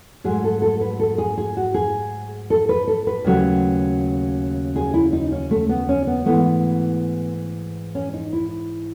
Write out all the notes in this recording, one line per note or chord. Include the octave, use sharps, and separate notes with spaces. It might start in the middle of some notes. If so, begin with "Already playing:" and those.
G#2 F#3 A3 G#4
A4
A4
B4
A4
G#4
G#4
F#4
G#4
A4
B4
A4
B4
D#2 C#3 F#3 A3
G#4
E4
D#4
C#4
A3
B3
C#4
B3
G#2 E3 A3 B3
C#4
D#4
E4